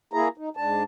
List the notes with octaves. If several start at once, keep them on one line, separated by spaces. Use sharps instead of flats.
A#3 E4 G#4 A#5
D#4
G#2 D4 A5